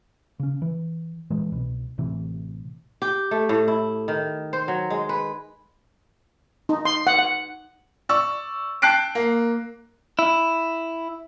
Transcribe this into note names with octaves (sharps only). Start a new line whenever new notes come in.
C#3 C#4
E3
A#2 E3 G#3
C2 B2
A1 A2 C3 E3
G4
A3
A2
E4
D#3
C5
F#3
G#3
B4
D#4
C6
F#5
F#5
D5 C#6 E6
G5 A5 F#6 C7 D7
A#3
E4